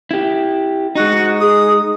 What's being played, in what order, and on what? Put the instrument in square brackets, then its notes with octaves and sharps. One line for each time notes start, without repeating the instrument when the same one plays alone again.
[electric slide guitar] E4 G4
[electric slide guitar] G#3 D#4 [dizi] F#4
[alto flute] G#4 [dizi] D#6